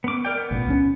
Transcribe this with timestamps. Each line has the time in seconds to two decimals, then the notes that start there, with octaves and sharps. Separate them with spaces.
0.04 B3 D6
0.25 A#4 D5 G5
0.37 B3
0.51 A1 A#2
0.66 C#2 F#3 C#4